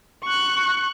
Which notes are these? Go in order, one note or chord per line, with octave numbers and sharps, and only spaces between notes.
C#6 F#6